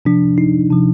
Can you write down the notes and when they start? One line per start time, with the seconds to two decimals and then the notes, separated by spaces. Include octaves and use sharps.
0.05 C3 F3 D4
0.38 D#4
0.70 C3 F3